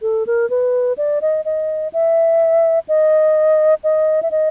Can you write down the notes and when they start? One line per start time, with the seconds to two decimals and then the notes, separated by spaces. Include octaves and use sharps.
0.02 A4
0.27 A#4
0.50 B4
0.98 D5
1.22 D#5
1.45 D#5
1.93 E5
2.88 D#5
3.84 D#5
4.23 E5
4.31 D#5